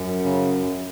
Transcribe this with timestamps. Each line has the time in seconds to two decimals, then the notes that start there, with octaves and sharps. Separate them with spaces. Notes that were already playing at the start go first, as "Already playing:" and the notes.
Already playing: F#2
0.24 C#3